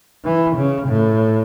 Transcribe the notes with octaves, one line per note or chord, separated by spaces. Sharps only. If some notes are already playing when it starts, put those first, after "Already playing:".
E3
C#3
A2